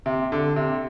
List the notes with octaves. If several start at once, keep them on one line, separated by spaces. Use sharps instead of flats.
C3
D3
C3